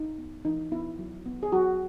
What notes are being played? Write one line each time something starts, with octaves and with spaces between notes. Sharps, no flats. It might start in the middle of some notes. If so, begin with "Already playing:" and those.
Already playing: D#4
B3
E3 D#4
B3 E4
F#3
B3
G#4
F#3 F#4